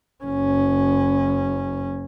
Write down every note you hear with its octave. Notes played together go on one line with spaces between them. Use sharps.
F#1 C#4